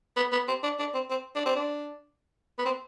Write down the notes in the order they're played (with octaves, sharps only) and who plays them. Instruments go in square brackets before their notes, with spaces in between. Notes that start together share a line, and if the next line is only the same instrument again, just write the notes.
[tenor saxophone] B3
B3
C4
D4
D4
C4
C4
D4
C4
D4
B3
C4